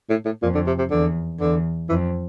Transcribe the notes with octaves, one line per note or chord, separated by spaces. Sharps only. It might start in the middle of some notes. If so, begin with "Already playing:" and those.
A2
A2
F2 A#2
D3
C3
C3
E2 D3
E2 D3
F2 E3